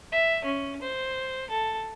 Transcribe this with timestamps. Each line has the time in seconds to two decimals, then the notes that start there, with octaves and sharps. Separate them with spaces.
0.12 E5
0.44 C#4
0.81 C5
1.50 A4